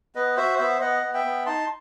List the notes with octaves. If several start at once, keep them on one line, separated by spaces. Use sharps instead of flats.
B3 B4 D#5
F#4 C5 E5
B3 C5 E5
B3 D#5 F#5
B3
E5 G5
B3
D#4 A5 C6